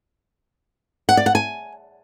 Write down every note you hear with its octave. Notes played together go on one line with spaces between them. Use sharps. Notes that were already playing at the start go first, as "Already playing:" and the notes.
F#5
D5
F#5
G#5